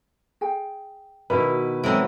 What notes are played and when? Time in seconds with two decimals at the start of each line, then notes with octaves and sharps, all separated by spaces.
0.41 G#4 G5
1.30 B2 D#3 E4 B4
1.84 E3 F#3 G#3 C4 E4 A4 F#5 A#5